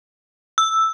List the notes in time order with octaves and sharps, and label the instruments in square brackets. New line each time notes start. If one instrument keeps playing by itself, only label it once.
[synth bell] E6